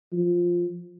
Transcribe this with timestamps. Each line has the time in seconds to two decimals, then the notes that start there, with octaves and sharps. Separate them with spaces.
0.13 F3